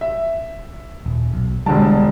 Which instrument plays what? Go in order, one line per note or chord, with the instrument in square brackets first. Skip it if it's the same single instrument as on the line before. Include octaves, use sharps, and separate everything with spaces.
[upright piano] E5
[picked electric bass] D#1
B1
[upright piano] E1 D3 A5 [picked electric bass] D2 G3